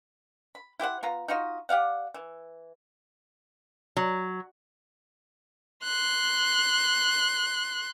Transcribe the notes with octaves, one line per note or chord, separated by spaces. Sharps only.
B5
E4 G4 C5 F#5
B3 F4 A#5
D#4 F4 F#4 D#5
G4 D5 F5 F#5
E3
F#3
C6 F#6